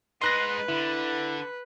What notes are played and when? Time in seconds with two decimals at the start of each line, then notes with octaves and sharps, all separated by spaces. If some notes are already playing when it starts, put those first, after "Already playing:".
0.22 G#3 D#4 B4 C6 F#6 A#6
0.68 D3 E4